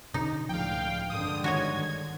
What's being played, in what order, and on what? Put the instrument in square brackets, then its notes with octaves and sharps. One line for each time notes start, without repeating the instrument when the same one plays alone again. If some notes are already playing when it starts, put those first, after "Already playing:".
[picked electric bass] B2 D3 D4 [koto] D#4
[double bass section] C#2 A2 D3 [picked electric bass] F3 [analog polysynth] F5 G5
[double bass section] G2 D3 G#3 [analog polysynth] D#6
[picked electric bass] D#3 [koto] F#4 C#5 D#5 [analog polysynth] G#6